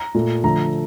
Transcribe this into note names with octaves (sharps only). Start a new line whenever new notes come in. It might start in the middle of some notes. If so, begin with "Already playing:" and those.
Already playing: A#5
A#2 A3
D3 F3 A3 A#5